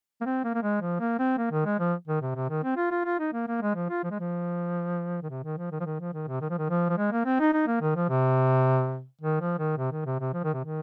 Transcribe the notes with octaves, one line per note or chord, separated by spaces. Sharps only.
A#3
C4
A#3
A#3
G#3
F3
A#3
C4
A#3
D#3
G#3
F3
D#3
C3
C3
D#3
C4
F4
F4
F4
D#4
A#3
A#3
G#3
F3
F4
F3
G#3
F3
D#3
C3
D#3
F3
D#3
F3
D#3
F3
D#3
C3
D#3
F3
D#3
F3
F3
G#3
A#3
C4
D#4
D#4
A#3
D#3
F3
C3
D#3
F3
D#3
C3
D#3
C3
C3
F3
D#3
C3
D#3